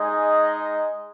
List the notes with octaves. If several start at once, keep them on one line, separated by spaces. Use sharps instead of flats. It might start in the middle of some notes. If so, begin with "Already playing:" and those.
Already playing: G#3 D#4 G#4 D#5